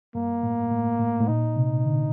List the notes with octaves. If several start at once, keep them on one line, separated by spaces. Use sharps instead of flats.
G2 A#3
A2
A2
A2
A2
A#2 D#4
C3
D3